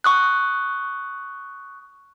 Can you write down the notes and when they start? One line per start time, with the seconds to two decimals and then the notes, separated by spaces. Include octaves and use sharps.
0.04 C#6 D#6 F#6